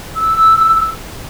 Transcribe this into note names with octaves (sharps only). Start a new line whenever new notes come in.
E6